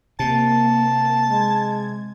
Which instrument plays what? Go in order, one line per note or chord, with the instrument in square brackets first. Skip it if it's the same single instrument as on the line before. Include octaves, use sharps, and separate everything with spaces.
[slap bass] C3 [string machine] A#3 [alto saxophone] A5
[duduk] G#3 [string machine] G#6